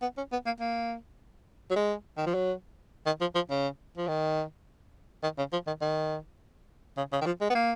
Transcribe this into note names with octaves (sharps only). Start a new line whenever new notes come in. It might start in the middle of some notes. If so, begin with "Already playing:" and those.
B3
C#4
B3
A#3
A#3
F#3
G#3
D#3
F3
F#3
D#3
F3
F3
C#3
F3
D#3
D#3
C#3
F3
D#3
D#3
C#3
C#3
D#3
F3
G#3
B3
A#3